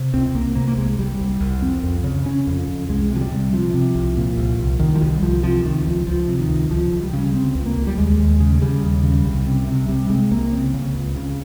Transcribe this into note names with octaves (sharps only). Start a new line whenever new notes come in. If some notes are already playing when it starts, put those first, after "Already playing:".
Already playing: C3
C#2 C4
C2 A#3
C3 A#3
A#3
C2 G#3
C2 G3
C2
C2
F2 C4
F2
C#3
C#3 C#4
F2
F2
C2 G#3
C3
F3
G3
C3
C3 F3
C3
C2
A#2
C2
C2
C2 D#3
F3
C2 G3
C2 F3
C3 F3
C#2 D#3
C#2 F3
C#2 F3
C3
D#3
C#2
C#2 F3
C#2
G3
C#3
C#3 C4
C#2
A#3
C#2
G3
D#2 G#3
D#2
C#3
G#3
C#3 G3
D#2
C#3
C2 G3
C3
C3
C3 G3
C3 G#3
C2 A#3
C#3 C4
C#3
C#2
C#3